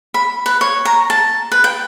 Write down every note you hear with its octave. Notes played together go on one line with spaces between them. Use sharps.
B5
B4
C#5
A#5
A5
B4
G5